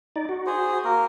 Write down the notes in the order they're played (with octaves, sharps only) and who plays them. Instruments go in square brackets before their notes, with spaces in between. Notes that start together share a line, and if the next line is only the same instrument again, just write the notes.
[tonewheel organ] D#4 D5
F#4
[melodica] G#4 C5
A#3 A#4